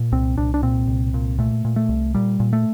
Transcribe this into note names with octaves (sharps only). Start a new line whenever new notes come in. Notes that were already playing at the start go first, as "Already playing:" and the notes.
Already playing: A#2
C2 C4
C2 D4
D4
A#2 C4
C2
A#2
A#2 A3
A#2
A3
C2
A#2 G3
A#2
A3